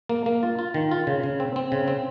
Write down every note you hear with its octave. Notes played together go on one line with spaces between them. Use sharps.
A#3
A#3
F4
F4
D#3
F4
C#3
C#3
C4
C4
C#3
C4